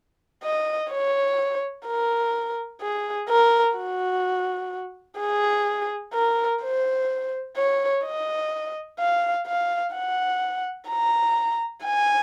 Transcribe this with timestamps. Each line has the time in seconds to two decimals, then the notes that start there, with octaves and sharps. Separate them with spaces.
0.44 D#5
0.91 C#5
1.87 A#4
2.81 G#4
3.29 A#4
3.77 F#4
5.20 G#4
6.14 A#4
6.62 C5
7.57 C#5
8.05 D#5
8.99 F5
9.47 F5
9.95 F#5
10.89 A#5
11.84 G#5